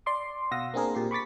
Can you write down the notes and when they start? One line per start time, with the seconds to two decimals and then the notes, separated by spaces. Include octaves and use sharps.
0.06 D5 C6 D6
0.51 B2 F5 F#5 D#6 E6 A#6
0.74 A#3 C4 D4 G#4 A#4
0.95 A#2 G4 C7
1.11 B5 C#6 D6 A6 B6